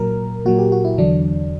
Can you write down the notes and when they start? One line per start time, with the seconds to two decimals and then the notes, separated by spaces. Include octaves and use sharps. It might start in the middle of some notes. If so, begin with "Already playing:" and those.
Already playing: A#2 F#3 A#4
0.45 A#2 F#3 F#4
0.59 G4
0.72 F#4
0.85 E4
0.98 E2 D3 F#3 D4